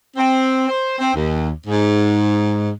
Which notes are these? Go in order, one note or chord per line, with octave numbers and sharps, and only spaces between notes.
C4
C5
C4
D#2
G#2